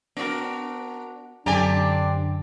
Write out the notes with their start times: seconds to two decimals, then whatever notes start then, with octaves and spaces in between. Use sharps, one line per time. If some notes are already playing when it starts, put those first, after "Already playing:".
0.17 B3 D4 F#4 A#4
1.46 F#2 D3 C4 D4 G4 D5 G#5 A#5